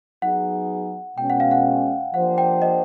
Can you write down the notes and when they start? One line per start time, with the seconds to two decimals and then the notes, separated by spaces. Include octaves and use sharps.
0.22 F#3 B3 D#4 G#4 F#5
1.17 B2 G#3 C#4 G5
1.30 F#5
1.40 F5
1.51 F#5
2.13 F3 A#3 D4 G4 C5 F#5
2.38 G5
2.62 D#5